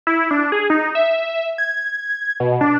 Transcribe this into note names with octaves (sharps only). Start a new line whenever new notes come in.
E4
D4
G#4
D#4
E5
G#6
B2
D4